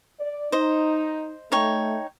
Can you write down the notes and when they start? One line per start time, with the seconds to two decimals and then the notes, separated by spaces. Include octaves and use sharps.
0.20 D5
0.52 D#4 C5 D#5
1.52 A3 D#4 C#5 G5